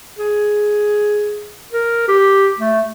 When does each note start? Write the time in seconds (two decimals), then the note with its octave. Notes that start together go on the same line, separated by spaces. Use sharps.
0.19 G#4
1.72 A#4
2.08 G4
2.59 A3